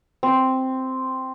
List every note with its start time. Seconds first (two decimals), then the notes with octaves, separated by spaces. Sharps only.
0.23 C4